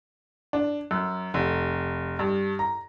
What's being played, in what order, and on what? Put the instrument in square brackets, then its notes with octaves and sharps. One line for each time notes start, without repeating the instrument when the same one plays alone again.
[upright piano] D4
F#2
F1
G2
A#5